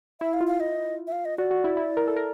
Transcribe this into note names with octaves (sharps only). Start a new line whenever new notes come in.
E4 E5
F5
F4
F5
D#5
E5
F5
D#5
F#4 D5
F#4
E4
E4
A#4
A4
A#4